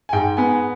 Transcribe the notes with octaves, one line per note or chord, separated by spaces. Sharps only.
G#5
G#2 G5
B3 G#5